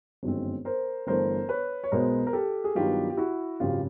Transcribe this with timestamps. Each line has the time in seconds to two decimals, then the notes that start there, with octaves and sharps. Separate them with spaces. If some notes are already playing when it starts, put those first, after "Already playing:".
0.23 G1 F#2 D#3 G#3 C4
0.65 A#4 C5
1.07 G1 G2 E3 A3 A#4 C5
1.49 B4 C#5
1.84 C#5
1.92 B1 B2 G#3 B3 A#4 C5
2.27 A#4
2.33 G4 A4
2.64 G#4
2.75 G2 D#3 F#3 B3 F4 G4
3.10 G4
3.17 E4 F#4
3.60 G#1 F#2 C#3 F4 G4